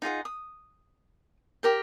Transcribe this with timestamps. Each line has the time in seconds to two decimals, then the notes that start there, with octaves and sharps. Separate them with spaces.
0.02 D#4 F4 G#4 F#5
0.25 D#6
1.63 G4 A#4 G5